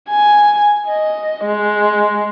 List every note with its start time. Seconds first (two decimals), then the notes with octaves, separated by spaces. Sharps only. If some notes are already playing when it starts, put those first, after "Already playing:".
0.10 G#5
0.87 D#5
1.45 G#3